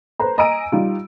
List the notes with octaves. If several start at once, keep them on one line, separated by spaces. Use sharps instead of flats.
A4 B4 C5 A#5
D#5 G#5 A#5 E6 D7 D#7
G3 D#4 F4